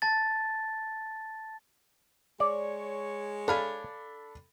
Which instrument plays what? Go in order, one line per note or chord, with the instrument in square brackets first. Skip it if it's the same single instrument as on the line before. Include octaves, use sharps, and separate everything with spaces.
[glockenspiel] A5 A6
[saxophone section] G#3 C#5 [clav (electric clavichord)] D5
[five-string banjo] D4 F5 G#5 [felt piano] A4 B5